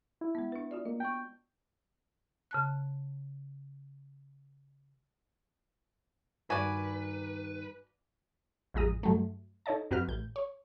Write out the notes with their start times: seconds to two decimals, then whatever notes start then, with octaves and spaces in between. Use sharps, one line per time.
0.21 E4
0.35 G#3 B3
0.52 D4 B4
0.71 F4 F#4 D5
0.85 A#3 D#5
1.00 B3 G5 C#6
2.51 C#3 A5 F#6
6.50 G2 D#3 F#4 B4 D5 G#5
8.74 A1 F2 G#3 A#5 D#6
9.03 G2 F#3 A3
9.66 D#4 A4 C#5 D#5 A5
9.91 F#2 C4 F#4 B4 F6
10.07 A1 G6
10.36 C#5